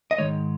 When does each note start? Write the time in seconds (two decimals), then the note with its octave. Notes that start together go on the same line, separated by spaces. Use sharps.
0.11 D#5
0.18 G#2 D#3 G#3 C#5